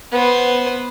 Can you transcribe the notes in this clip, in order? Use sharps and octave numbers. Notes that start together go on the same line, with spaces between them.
B3 C5